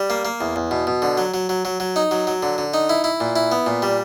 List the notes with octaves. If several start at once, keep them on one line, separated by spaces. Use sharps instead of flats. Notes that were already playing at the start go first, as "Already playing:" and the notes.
Already playing: G3
A#3
A#3
E2
E2
B2
B2
D3
F#3
F#3
F#3
F#3
F#3
D#4
F#3
F#3
D3
D3
D#4
E4
E4
A#2
E4
B3
A#2
G3